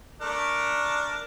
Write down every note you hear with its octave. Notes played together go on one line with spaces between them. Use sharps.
A3 D4 A#4